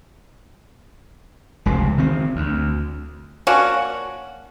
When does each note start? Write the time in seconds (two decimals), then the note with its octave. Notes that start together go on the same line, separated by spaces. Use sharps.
1.66 F1 C#2 C3
1.98 D#3 C4
2.36 D2
3.47 A#3 C#4 D4 F#4